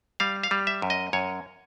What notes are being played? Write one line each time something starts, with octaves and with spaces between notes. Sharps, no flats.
G3 F5
F5
G3
E5
F#2
D#5
F#2 C#5